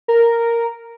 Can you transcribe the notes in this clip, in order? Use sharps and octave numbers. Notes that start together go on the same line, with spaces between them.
A#4